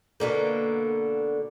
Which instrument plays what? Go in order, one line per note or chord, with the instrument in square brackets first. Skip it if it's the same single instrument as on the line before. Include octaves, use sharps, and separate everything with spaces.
[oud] B2 D3 A#3